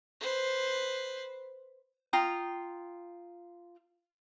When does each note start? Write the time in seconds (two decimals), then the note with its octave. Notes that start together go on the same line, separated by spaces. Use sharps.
0.21 B4 C5
2.13 F4 G5 A#5 D#6